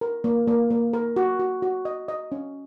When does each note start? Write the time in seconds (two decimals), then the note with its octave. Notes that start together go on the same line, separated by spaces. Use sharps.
0.01 A#4
0.24 A#3
0.47 A#3
0.70 A#3
0.93 A#4
1.16 F#4
1.40 F#4
1.62 F#4
1.85 D#5
2.08 D#5
2.32 C#4